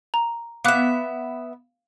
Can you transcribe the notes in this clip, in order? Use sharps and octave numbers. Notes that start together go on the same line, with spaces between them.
A#5
B3 E5 F5 D6 F#6